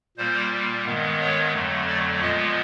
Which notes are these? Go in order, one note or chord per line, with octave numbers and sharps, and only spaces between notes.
A#2 G3 A#3 C5
G2 D#3 G#3 B3
C#5
F2 D3 F#3 A3
D5
A#2 F3 G#3 B3 D#5